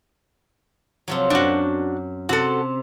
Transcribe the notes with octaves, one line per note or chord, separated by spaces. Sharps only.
C3 F3 F#3
F#2 D4 F#4
C3 F#4 A4